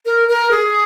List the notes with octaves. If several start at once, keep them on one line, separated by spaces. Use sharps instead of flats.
A#4
A#4
G#4